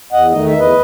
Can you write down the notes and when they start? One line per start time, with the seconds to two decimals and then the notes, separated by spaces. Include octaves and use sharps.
0.13 E2 D#5 F#5
0.32 D#3 A3 D#4 D#5
0.46 E5
0.53 E2
0.59 B4 D#5